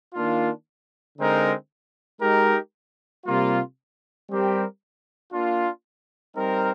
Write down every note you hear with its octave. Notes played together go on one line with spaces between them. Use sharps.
D#3 A#3 D4 F4
D3 G#3 C4 D#4 A#4
G#3 D#4 G4 A#4
C3 G3 A#3 F4
G3 C4 G4 A#4
A#3 D4 F4
G3 C4 D#4 A#4